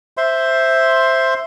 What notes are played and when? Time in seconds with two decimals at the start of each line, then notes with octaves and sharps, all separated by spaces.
0.17 C5 E5 C6